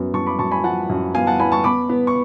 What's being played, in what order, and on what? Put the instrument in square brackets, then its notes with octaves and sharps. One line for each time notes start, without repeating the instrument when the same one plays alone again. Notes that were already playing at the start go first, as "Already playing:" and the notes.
Already playing: [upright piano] F#2 B3
F#2 A5 C#6
B5 D6
F#2 A5 C#6
G#5 B5
F3 F#5 A5
F#2
B3 F5 G#5
F#5 A5
B3 G#5 B5
A5 C#6
B3 B5 D6
B3
C#6